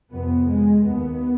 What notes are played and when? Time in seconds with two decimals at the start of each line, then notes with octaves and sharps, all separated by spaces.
0.13 F2 C3 B3
0.50 G#3
0.86 D#2 B3